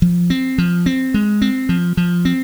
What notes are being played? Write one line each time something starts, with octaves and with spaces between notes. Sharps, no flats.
F3
C4
F3
C4
G#3
C4
F3
F3
C4